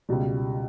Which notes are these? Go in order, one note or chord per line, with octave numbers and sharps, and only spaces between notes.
C#2 B2 G3